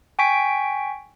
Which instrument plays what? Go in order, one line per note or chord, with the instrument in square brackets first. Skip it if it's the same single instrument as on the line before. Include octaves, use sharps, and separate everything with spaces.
[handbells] G5 G#5 C#6 B6 D7